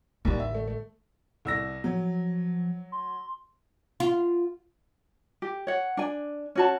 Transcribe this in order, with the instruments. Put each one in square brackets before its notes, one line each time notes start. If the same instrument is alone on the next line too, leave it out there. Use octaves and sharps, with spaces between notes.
[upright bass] A1 D3 [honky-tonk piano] D#2 G3
[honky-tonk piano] E5
A3
A3
[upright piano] C2 E6 A#6
[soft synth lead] F3 [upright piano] F#3
[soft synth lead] C6
[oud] F4
[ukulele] G4
C#5 F#5
D4 G#5
C#4 F#4 A5